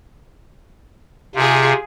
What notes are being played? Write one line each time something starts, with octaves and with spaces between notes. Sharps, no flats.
C3 F4 G#4